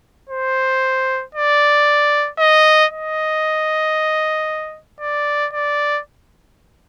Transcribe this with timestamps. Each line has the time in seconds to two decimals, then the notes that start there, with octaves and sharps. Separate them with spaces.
0.30 C5
1.35 D5
2.39 D#5
2.91 D#5
5.01 D5
5.53 D5